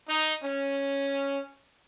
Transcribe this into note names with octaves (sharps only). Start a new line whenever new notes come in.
D#4
C#4